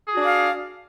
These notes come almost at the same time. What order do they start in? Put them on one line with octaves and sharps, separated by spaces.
G#4 F#4 D4 D5 F5